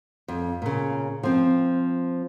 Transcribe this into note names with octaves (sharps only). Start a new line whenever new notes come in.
F2
A#2 C#3
F3 C4